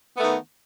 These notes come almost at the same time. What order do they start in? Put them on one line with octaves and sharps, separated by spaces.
B3 A3 D#3